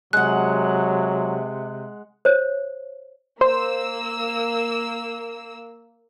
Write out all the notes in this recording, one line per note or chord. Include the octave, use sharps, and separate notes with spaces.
C3 F#3 G#3 F#5 F#6
C5 C#5
A#3 C5 E6